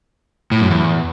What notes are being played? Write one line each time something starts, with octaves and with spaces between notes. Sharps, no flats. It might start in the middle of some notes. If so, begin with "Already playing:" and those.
A2
F#2
E2